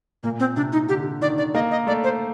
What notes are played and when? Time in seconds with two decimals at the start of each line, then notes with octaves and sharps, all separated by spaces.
0.23 A#2 A#3
0.40 C4
0.56 C3 D4
0.73 D#4
0.89 D3 G4
1.21 D#3 D5
1.38 D5
1.55 A#3 D#5
1.71 D#5
1.87 A3 D5
2.04 C5